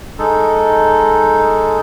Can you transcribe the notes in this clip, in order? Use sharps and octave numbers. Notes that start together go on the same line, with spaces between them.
G#3 D#4 A4